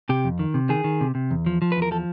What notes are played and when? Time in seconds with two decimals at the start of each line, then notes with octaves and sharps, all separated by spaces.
0.09 C3 G4
0.25 F2
0.39 D#3
0.54 C3
0.69 D#3 G#4
0.84 D#3
1.01 C3
1.15 C3
1.31 E2
1.46 F3
1.62 F3
1.72 E2 B4
1.82 A#4
1.91 F3 A4